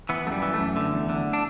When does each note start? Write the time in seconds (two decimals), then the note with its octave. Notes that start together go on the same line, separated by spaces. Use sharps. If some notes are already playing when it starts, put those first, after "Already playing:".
0.09 E3 B3
0.26 F#2 A3
0.32 G3
0.42 E3
0.54 A3
0.59 F#2
0.76 D3
0.93 E2
1.09 D3
1.33 D4